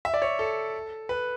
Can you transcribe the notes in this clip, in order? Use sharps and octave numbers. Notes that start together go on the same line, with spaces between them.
E5
D5
C#5
A4
B4